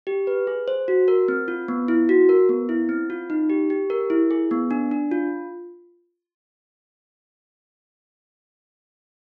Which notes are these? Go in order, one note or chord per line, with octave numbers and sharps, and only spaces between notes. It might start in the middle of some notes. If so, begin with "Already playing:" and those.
G4
B4
G#4
C5
F#4
A#4
C4
F4
B3
E4
F#4
A#4
B3
E4
C4
F4
D#4
G4
G4
A#4
E4
G#4
B3
D4
D4
F4